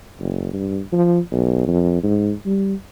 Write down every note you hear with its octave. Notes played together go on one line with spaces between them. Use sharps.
F#1
G2
F3
B1
F2
G#2
G3